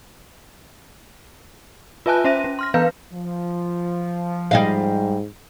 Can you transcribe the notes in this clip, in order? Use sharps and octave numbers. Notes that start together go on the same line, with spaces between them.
F4 B4 E5 G#5 A5 F#6
C#4 C5 E5 A#6 D#7
C#4
C6 F6 A#6
E3 B3 B4 F5 G6
F3
G#2 G3 D#5 F5